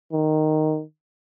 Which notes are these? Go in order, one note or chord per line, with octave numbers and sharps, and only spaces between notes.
D#3